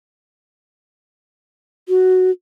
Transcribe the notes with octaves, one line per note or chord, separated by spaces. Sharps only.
F#4